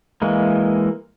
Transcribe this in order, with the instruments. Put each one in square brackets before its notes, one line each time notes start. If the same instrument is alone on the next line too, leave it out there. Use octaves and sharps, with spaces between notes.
[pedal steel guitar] E3 G#3 A#3